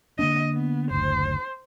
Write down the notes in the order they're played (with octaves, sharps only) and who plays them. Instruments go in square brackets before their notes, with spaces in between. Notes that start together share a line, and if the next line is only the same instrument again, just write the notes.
[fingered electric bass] D3 A#3 D4 [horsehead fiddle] D#5
[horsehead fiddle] B3
[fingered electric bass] F#1 D2 [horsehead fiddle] C5